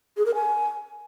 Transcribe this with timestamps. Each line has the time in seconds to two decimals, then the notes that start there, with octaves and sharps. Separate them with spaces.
0.17 G#4
0.26 A#4
0.35 G#5